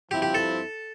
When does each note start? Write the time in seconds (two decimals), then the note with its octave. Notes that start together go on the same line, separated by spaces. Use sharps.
0.11 G2 F3 C4 E4 G4
0.22 G4
0.34 A4